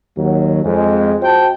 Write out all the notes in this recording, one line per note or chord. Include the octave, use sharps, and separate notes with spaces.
D#2 F#3
F2 G#3
F#4 C5 G5 A5